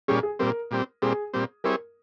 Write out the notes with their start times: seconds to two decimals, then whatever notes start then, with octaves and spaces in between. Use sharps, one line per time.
0.08 A#2 G3 C#4 G#4
0.23 G#4
0.39 A#2 G3 C4 A#4
0.71 A#2 G3 C4
1.02 A#2 G3 C4 G#4
1.33 A#2 G3 C4
1.64 G3 C4 E4 G#4 A#4 C#5